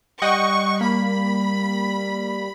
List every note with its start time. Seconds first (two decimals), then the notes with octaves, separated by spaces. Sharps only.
0.22 G3 D#5 F#5 G5 C#6
0.81 A#3 B5